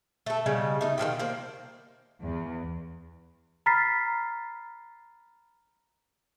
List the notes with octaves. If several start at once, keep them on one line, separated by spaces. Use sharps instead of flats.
A3 A4
C#3 G3 G#3
A3 D#4
D#3 F3 F4 G4
A#3 C5 D5
E2
A#5 B5 F6 A6 B6 C7